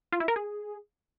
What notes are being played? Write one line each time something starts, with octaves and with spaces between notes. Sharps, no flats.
F4
E4
A#4
G#4